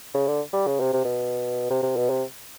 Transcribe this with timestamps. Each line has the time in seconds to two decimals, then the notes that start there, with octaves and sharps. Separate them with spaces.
0.15 C#3
0.27 D3
0.53 G3
0.67 C#3
0.80 C3
0.93 C3
1.05 B2
1.70 C3
1.83 C3
1.97 B2
2.10 C3